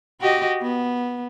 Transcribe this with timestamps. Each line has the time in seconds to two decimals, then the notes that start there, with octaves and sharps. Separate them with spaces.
0.20 F#4 G4 D#5
0.61 B3